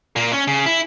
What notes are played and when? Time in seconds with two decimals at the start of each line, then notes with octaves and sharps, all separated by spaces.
0.16 A#2 A#3
0.32 C#4
0.48 C#3
0.66 E4